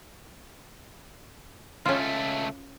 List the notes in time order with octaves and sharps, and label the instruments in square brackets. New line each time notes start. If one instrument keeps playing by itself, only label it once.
[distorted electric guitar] C#2 A3 [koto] C#4 F4